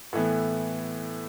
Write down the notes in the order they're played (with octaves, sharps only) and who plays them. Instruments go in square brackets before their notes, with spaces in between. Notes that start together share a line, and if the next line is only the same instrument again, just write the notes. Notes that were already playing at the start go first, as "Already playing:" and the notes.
[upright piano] A2 E3 B3 A4